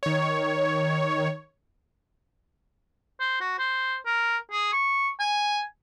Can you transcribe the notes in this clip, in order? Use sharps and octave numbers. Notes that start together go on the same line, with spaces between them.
D#3 C#5
C5
F#4
C5
A#4
G#4
C#6
G#5